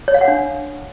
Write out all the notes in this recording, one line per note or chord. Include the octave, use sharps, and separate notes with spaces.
C#5
F5
F#5
D4